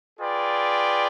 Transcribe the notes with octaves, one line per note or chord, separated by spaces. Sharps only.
F4 G#4 B4 D5 G5